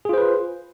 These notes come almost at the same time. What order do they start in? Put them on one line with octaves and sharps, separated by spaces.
G#4 F4 C5 B4